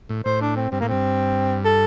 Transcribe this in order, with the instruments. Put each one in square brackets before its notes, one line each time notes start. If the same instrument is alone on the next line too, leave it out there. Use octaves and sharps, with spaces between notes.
[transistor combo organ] A2
[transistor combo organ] A2 [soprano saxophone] C5
[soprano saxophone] D4
C4
[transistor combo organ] G2 [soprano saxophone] C4
[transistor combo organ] A2 [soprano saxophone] A#3
[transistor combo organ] G2 [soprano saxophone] C4
[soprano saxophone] A4